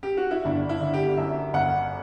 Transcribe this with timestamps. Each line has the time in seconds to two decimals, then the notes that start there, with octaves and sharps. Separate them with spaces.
0.03 G4
0.17 F#4
0.31 E4
0.45 G1 D4
0.69 E4
0.81 D3
0.94 G4
1.17 F#2 E5
1.53 G1 F#5